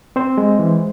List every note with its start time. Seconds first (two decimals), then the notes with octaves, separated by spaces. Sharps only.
0.16 C4 C5
0.38 G#3
0.59 E3